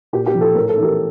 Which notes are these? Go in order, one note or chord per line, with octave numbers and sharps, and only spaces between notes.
A#2 G4
G4
F3
A4
A2 A#4
A4
E3
G4 A#4